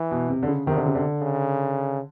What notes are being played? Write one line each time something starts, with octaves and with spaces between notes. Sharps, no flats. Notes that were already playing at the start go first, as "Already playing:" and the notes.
Already playing: E3
B2
C3
D3
C#3
C3 D#3
D3
C#3
D3
C#3